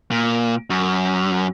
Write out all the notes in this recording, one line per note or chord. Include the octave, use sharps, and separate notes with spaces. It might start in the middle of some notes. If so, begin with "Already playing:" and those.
A#2
F#2